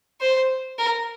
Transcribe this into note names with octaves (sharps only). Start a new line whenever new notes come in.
C5
A#4